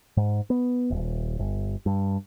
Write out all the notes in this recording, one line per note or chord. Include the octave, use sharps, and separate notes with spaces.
G#2
B3
D#1
G1
G2